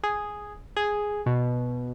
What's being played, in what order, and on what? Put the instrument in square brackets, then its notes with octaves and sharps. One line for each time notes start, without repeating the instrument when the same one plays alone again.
[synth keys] G#4
G#4
B2